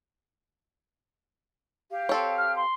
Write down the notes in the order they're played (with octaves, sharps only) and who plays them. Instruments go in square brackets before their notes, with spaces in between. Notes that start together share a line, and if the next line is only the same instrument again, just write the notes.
[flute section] G4 F5
[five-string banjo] C4 A4 C#5
[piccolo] F6
C6